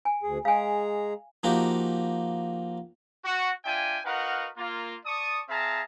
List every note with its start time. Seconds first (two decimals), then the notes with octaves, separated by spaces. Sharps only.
0.05 G#5
0.23 D2 G#4
0.45 G#3 G#4 F5 G#5 A#5
1.43 F3 A#3 D#4 F#4 G4
3.25 F#4
3.65 D4 F4 E5 G5 G#5
4.05 D#4 F#4 A#4 B4 F5 F#5
4.57 A#3 F4
5.06 D5 A5 C#6 D#6
5.48 C4 G#4 E5 F5 A5 A#5